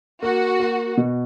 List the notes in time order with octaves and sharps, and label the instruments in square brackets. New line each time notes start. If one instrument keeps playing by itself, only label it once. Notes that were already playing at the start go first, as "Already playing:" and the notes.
[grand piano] A#3 [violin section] F#4
[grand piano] A#3
B2